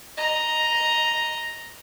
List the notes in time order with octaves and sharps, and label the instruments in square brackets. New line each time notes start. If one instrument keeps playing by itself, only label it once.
[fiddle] D#5 A#5